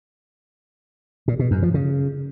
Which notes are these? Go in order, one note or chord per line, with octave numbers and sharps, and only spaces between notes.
A#2
B2
F#2
F3
C#3